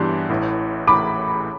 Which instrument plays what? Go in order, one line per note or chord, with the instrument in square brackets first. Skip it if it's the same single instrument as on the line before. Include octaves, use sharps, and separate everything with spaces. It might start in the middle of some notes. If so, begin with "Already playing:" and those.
Already playing: [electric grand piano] G2 E3 B3 D4 G4 [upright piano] C6
[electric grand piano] A1 A2 E3
[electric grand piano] A1 A2 E3 [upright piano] B5 D6